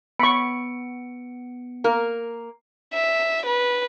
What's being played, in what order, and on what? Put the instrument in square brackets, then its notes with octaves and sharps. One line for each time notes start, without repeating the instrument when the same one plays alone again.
[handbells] B3 C#7 D7 [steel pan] B5 C#6
[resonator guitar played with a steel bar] A#3 A#4
[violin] E5
B4